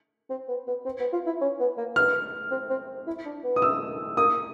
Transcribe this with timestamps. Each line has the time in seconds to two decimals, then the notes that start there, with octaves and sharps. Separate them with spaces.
0.30 C4
0.48 B3
0.67 B3
0.85 C4
1.00 B3
1.13 F4
1.26 E4
1.41 C#4
1.60 B3
1.78 A#3
1.96 B3 F6
2.51 C4
2.70 C4
3.07 E4
3.25 D4
3.44 B3
3.56 D#6
3.62 E6
4.17 A#3 D#6